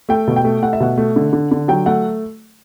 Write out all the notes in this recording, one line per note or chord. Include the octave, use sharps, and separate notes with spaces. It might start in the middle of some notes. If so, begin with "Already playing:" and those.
A3 G5
B2
G5
A3
A3 F#5
E5
B2 F#5
A3
D3
D3
D3
F#3 G5
A3 F#5